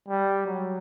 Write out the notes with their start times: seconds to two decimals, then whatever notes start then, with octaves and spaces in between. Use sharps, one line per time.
0.08 G3
0.46 F#3